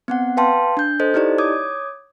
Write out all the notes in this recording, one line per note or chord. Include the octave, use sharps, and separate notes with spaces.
B3 C4 F#5
B4 F5 G5 A5 C6
D4 G6
A4 C5 D#5
D#4 E4 G4 D5 D#5
C#5 D6 D#6 G#6